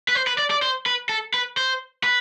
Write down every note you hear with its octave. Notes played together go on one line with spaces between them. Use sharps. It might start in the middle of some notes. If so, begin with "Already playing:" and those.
B4
C5
B4
D5
D5
C5
B4
A4
B4
C5
B4